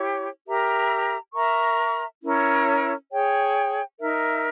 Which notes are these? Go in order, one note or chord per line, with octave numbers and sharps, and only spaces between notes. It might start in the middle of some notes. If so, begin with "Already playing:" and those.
Already playing: E4 G4 C#5
G4 A#4 E5 A#5
A#4 E5 A#5 C#6
C#4 E4 A#4 C#5
G#4 C#5 G5
D#4 A#4 E5